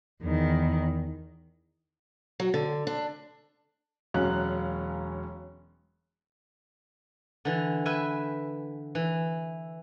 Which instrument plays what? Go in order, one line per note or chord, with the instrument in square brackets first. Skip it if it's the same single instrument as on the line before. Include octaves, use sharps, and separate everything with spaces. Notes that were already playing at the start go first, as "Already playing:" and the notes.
[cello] E2 D#3
[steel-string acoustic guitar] F#3
D3
D4
[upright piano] E1 F#3 C#4 F5 F#6
[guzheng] D3 E3
B4 E5 G5 G#5
E3